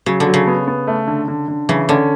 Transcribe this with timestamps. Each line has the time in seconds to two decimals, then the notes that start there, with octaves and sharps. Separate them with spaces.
0.06 C#3 F#3
0.20 D3
0.27 F#3
0.34 C#3
0.47 B3
0.68 B3
0.87 A3
1.08 D3
1.28 D3
1.48 D3
1.69 C#3 E3
1.89 D3 C#4